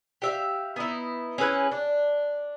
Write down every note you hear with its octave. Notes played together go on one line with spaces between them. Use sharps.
G4 E5 F5
B3 D#4 E4
C#4 E4 G#4 B4
D4